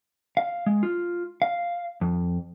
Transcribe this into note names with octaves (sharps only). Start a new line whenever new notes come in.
F5
G#3
F4
F5
F2